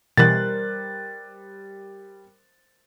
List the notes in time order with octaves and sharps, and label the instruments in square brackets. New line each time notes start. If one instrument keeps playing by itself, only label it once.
[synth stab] B2 E3 [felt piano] G3 F#6 [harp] A#4 C5 [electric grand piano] A6